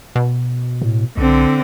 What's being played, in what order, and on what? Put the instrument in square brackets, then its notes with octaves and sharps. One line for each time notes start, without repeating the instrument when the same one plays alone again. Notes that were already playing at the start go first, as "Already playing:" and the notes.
[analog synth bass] B2
[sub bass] A2
[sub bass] B1 [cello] D3 C4